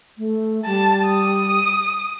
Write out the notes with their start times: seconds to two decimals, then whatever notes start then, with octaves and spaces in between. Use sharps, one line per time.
0.18 A3
0.66 G3 A5
1.06 D#6